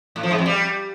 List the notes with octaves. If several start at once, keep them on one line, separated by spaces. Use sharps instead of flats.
A2
F3
G#2
F2
G3